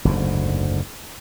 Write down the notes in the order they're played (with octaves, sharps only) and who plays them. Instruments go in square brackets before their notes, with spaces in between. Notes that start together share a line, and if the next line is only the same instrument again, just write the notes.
[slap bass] F#1 D2 G#2